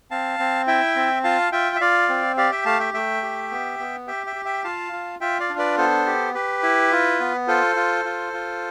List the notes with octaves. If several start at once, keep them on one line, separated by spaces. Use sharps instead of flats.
C4 F5 A5
C4
E4 E5 G5
C4
F4 F5 A5
F4 E5 G5
E5
F4 D5 F5
C4
G4 D5 F5
E5 G5
A3 F5 A5
E5 G5
A3 E5 G5
G4
B3
B3
G4 E5 G5
E5 G5
G4
E5 G5
F4 F5 A5
F4
F4 E5 G5
D5 F5
D4
B4 D5
B3 A4 C5
G4
G4 B4
E4
F4
B3
F4 A4 C5
F4
F4
F4